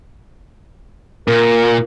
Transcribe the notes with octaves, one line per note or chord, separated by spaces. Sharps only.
A#2 A#4